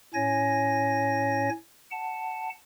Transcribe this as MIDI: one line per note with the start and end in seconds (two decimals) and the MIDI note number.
0.14 1.50 45
0.14 1.50 61
0.14 1.50 73
0.14 1.50 80
0.14 1.50 94
1.91 2.49 78
1.91 2.49 81